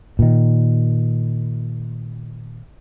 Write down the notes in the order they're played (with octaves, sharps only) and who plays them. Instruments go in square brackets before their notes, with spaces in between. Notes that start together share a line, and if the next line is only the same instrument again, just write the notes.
[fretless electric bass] A#2 D#3